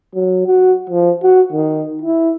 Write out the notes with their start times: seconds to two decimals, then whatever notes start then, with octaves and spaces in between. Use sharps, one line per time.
0.15 F#3
0.46 F#4
0.89 F3
1.23 F#4
1.52 D#3
2.02 E4